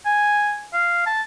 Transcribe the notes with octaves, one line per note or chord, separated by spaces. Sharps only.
G#5
F5
A5